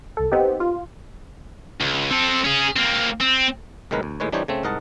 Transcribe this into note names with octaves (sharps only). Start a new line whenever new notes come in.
C2 A4
B3 C4 D#4 G4
F4
C#2
C4 A4
C#4 G#4
A#3 C4
C4
C2 A2 D#3 G#3 A#4 B4
D2
D#2 A2 G#3 B4 C#5
E3 G3 D4 D#4 C5 C#5
C#3 A3 C4
C2 G#2 A#4 D#5 F#5 A5